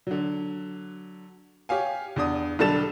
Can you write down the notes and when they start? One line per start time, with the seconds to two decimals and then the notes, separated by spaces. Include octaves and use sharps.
0.07 D3 F#3
1.69 G4 C#5 F5 G#5
2.16 E2 D4 D#6
2.59 B1 D3 G3 A4 A6 E7